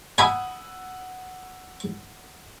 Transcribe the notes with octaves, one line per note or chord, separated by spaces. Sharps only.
F#5 G#5 B5 D#6 E6